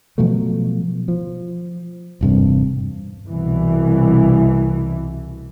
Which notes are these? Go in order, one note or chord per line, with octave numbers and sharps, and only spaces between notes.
B2 F3 F#3 A3
F3
E1 G2 C3
C2 B2 E3